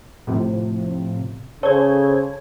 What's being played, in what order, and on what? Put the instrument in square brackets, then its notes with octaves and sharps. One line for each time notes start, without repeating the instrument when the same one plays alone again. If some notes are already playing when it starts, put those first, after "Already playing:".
[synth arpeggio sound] A2 C3 F3
[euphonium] C#3 [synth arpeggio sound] A4 C5 G#6 [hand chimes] C#5